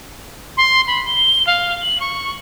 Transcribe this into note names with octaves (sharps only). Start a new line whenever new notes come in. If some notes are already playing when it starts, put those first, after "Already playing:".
C6
B5
G7
F5
F#7
C#6